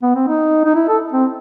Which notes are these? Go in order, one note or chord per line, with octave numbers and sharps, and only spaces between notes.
B3
C4
D#4
D#4
E4
A4
C4